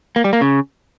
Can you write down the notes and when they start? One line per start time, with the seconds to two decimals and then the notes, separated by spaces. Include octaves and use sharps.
0.16 A#3
0.24 G3
0.33 A#3
0.41 C#3